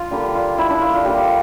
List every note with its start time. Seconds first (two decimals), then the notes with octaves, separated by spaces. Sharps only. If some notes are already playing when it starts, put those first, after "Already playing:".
Already playing: D4 F4
0.11 D3 G3 A#3 G4
0.35 F4
0.58 E4
0.70 D4
0.82 F4
0.93 F4
1.04 A#2 G3 D4 G4